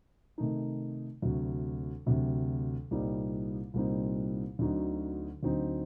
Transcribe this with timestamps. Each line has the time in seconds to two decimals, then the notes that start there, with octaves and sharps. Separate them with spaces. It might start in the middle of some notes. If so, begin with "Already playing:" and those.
0.38 C3 D#3 A3 D#4
1.22 D2 C3 F#3
2.06 D2 C3 F#3
2.91 C2 A#2 G3 C4 D#4
3.74 C2 A#2 G3 C4 D#4
4.59 D2 D3 F#3 C4 D#4
5.43 D2 D3 F#3 C4 D#4